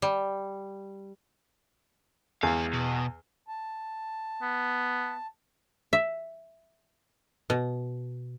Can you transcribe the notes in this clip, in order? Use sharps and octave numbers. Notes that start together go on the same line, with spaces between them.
G3
E2 G#3 F5
B2
A5
B3
E5
B2